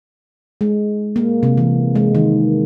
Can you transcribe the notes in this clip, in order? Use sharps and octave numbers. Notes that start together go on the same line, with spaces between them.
G#3
A#3
C3
E3
G#3
D#3